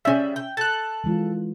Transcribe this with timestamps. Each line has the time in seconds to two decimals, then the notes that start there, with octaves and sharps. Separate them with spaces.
0.05 C#3 G3 C#4 E5
0.36 G5
0.57 A4 A5 F#6
1.04 E3 G#3 F4